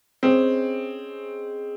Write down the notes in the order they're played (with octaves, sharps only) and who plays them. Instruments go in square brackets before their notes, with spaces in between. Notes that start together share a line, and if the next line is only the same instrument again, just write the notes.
[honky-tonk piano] C4 [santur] C#4 G#4 C5 D#5